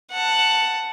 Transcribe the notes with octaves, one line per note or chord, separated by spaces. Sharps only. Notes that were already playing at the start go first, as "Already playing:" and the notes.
F#5 A5